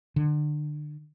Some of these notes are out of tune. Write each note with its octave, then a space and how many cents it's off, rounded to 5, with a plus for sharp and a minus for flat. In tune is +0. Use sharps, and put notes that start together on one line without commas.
D3 +30